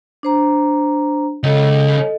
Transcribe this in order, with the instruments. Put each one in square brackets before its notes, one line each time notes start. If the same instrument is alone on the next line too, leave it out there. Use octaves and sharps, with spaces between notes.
[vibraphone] D4 C5 A#5
[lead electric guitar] C#2 C#3 [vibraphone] A4 D#5